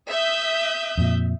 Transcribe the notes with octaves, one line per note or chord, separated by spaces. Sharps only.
E5 D#6 G6
F2 A#2